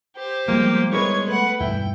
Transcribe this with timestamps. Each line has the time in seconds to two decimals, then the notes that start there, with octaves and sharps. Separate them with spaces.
0.16 G4 C5
0.48 F3 G3 G#3 A#3 B3
0.93 G#3 E4 A#4 B4 C#5 G#6
1.28 A3 B4 F#5
1.60 E2 G2 B2 E4 G5